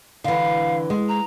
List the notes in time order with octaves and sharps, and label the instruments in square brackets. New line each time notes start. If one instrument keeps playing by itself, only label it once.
[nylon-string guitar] D3 E3 [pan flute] F5
[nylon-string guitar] G#3
[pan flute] A#5